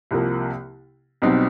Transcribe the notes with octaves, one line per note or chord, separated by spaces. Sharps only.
C2 C3 F3 A#3
B1 B2 G3 C4 D#4